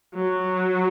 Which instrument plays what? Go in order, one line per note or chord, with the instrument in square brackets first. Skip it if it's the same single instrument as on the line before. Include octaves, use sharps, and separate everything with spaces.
[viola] F#3